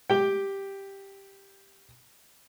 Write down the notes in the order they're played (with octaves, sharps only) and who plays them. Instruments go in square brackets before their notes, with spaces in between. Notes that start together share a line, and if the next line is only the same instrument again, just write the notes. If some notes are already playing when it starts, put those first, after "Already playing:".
[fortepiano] G4 G5